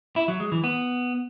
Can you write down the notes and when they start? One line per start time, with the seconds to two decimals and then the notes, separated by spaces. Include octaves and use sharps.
0.16 E4
0.28 F#3
0.40 G#3
0.52 E3
0.64 B3